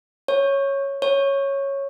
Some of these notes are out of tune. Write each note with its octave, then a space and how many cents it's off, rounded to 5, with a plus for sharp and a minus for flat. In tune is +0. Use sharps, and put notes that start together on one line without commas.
C#5 -5
C#5 -5